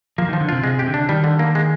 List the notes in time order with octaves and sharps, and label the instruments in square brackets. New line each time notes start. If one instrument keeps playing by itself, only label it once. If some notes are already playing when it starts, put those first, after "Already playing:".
[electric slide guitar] F3 [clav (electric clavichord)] A#3
[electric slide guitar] D#3 [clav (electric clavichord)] F3
[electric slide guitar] D3
[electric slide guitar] C3 [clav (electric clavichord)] F4
[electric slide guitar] C3 [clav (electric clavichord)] G#3
[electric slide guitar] C3 [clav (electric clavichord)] G4
[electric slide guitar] D3
[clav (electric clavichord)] D4
[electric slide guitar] D#3 [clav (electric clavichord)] G3
[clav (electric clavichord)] D3
A#3
G#3